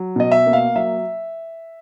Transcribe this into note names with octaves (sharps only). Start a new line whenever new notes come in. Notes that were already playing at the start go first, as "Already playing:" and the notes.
Already playing: F#3
B2 D#5
E5
A#3
F5
F#3 E5